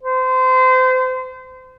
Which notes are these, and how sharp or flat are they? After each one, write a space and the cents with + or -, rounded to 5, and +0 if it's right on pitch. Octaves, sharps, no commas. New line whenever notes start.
C5 -30